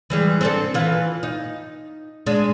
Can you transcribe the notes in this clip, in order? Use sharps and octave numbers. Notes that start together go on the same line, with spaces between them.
E3 G3 G#3
C4 D4 A4
E3 F4
D#4
G#3 D4